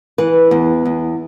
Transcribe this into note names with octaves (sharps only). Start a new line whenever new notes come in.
E3 B4
E2
E2